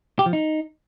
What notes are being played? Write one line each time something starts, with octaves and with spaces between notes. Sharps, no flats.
G4
F3
D#4